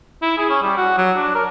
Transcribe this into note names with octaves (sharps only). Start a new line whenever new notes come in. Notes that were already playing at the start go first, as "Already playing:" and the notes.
E4
G#4
C#4
G3
F#4
F#3
D4
A#4